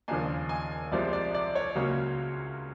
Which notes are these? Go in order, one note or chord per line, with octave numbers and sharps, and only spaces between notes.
D#2 C#3 F3 A#3 D4 G#5
G#5
C2 C3 F3 G#3 D5
D5
D5
C#5
C#2 C#3 F#3 A#3 C#4